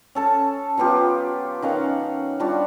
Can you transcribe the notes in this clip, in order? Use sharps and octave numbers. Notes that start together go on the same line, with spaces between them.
C#4 A4 A5
F#3 B3 F4 G4
D#3 C#4 F5 F#5
G3 D4 F4 F#4